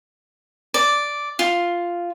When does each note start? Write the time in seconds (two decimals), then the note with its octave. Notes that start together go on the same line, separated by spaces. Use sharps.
0.74 D5
1.39 F4